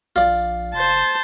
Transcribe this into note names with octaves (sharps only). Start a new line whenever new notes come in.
A#1 F4 D5
F1 C5 A5